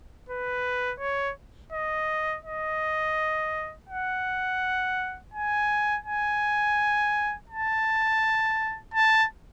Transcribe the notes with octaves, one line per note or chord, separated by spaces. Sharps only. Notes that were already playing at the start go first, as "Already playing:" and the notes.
B4
C#5
D#5
D#5
F#5
G#5
G#5
A5
A5